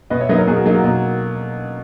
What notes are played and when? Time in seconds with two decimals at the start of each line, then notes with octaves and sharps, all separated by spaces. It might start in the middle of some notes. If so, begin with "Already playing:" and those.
0.10 B2 B4 D#5
0.20 C#5 E5
0.29 F#3 A#3 D#4 B4 D#5
0.38 A#4 C#5
0.47 B2 G#4
0.56 F#4 A#4
0.65 F#3 A#3 D#4 G#4
0.74 F#4 A#4
0.84 B2